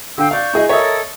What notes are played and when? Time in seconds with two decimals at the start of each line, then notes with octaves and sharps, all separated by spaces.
0.18 D3 F5 G5 E6
0.31 D5 F5 C#6 G6
0.53 E4 G#4 D#5
0.69 A4 A#4 C#5 D#5 E5 D#6